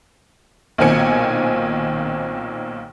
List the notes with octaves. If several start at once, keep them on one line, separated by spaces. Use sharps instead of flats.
B1 A#2 D#3 C4 G#5 C#7